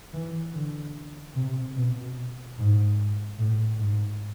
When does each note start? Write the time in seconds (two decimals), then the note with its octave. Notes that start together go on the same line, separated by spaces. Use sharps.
0.13 E3
0.54 D3
1.35 C3
1.75 B2
2.57 G#2
3.38 A2
3.78 G#2